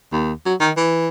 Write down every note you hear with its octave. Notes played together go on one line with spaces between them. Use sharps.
D#2
F#3
D#3
E3